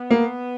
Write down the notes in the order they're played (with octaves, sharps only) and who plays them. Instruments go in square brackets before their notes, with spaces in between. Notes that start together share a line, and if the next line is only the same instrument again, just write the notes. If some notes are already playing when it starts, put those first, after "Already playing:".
Already playing: [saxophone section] B3
[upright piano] A#3